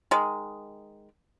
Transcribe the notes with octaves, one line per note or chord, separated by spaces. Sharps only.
D#3 G#3